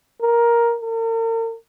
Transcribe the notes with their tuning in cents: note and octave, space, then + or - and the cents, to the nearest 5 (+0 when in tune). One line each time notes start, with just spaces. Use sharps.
A#4 +10
A#4 -40